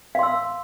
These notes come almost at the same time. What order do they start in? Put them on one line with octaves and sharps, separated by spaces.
F5 C6 E6